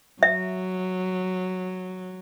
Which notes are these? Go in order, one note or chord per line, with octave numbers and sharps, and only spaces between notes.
F#3 E5